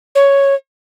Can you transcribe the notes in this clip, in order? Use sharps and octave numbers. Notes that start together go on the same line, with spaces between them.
C#5